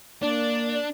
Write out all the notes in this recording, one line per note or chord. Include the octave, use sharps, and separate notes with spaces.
A#3 D4 D5